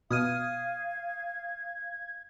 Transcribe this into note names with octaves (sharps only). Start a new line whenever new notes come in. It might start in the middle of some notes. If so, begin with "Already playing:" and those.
B2 F5 D#6 F6 G#6 D#7